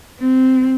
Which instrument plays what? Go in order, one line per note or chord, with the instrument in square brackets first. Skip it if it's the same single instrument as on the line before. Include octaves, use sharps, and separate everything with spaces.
[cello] C4